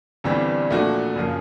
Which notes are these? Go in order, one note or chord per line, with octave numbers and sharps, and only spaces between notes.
G1 G2 E3 G3 C4
A#2 F3 A3 D4 F#4
F#2 C#3 F3 A#3